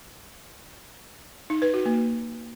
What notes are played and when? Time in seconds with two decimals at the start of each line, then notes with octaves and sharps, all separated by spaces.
1.50 D#4
1.62 B4
1.74 F#4
1.86 A#3